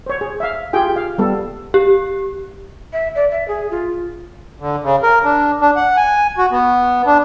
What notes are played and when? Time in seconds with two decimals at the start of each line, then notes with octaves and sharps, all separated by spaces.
0.06 C5 C#5
0.21 G#4
0.40 E5 F5
0.73 F4 G4 G#4 G5
0.96 F5
1.18 G3 B3 A4
1.74 G4
2.93 E5
3.15 D5
3.31 E5
3.48 G#4
3.71 F4
4.60 D3
4.84 C#3
5.03 A#4
5.24 D4
5.61 D4
5.76 F#5
5.97 G#5
6.38 F#4
6.51 B3
7.06 D4